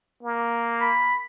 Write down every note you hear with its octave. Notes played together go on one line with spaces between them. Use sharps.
A#3
B5